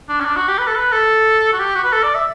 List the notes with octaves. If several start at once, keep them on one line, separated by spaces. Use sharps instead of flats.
D4
C#4
D4
F#4
G4
B4
A4
B4
A4
F#4
G4
F#4
B4
A4
D5
E5